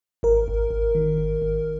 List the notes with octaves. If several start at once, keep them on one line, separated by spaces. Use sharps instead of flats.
G#1 A#4
G#1
G#1
D#3
G#1
G#1